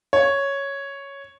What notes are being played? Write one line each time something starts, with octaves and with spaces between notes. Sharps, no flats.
C#5